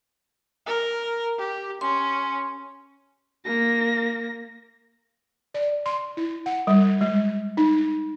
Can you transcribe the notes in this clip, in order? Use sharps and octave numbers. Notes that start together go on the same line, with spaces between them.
A#4
G4
C#4 C6
A#3 A#6
D5
C6
E4
F#5
G3
G#3
D#4